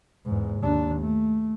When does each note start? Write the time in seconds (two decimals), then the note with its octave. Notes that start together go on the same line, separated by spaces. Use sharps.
0.25 E2 G#2
0.61 D#2 D4
1.01 A3